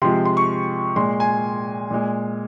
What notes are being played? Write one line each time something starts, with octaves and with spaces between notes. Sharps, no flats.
C3 F3 G#3 C6
C6
C#6
A#2 G#3 C6
G#5
A#2 G#3